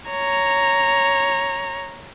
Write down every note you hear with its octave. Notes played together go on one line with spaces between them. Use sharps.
C#5 A#5